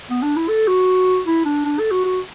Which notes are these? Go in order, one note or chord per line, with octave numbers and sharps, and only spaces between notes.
B3
D4
E4
A4
F#4
E4
D4
D4
A4
F#4
F#4